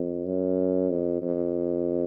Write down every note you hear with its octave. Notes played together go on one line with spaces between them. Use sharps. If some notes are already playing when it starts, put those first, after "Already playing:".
Already playing: F2
F#2
F2
F2